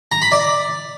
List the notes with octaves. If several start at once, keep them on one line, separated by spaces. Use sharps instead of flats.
A#5
B5
D5